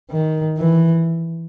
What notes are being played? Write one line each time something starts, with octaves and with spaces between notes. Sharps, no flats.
D#3
E3